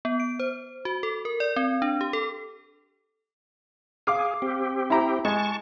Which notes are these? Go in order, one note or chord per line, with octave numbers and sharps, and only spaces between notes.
B3
D7
C5
F#4
A4
A#4
D5
C4
D4
G4
A4
G#4 F5 D6 F6
C4 G4
E4 A#5
G#3 A5 C#6